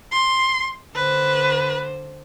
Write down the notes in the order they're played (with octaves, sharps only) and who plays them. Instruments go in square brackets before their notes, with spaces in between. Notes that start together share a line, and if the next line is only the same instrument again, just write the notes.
[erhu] C6
[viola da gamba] D3 C5 [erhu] B4